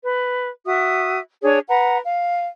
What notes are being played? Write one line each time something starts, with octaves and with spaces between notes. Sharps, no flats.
B4
F#4 E5 D#6
D4 G#4 C#5
B4 F#5 A#5
F5